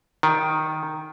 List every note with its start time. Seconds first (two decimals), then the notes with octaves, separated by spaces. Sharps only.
0.23 D#3